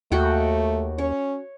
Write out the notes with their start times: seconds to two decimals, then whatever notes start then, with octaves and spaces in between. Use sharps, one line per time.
0.12 D#2 A3 F#4 F#5 G5
0.98 C#4 C#5